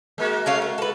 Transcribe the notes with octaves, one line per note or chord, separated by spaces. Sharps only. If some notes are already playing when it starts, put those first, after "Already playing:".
G#3 A#3 F#4
A3 C#4 F5
A3
A4 B4